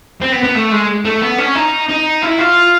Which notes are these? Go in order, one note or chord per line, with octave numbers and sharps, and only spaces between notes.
C4
B3
B3
A3
G#3
A3
B3
C#4
D#4
D#4
E4
F4